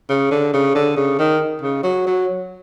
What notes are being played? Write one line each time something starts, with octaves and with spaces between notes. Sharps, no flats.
C#3
D3
C#3
D3
C#3
D#3
C#3
F#3
F#3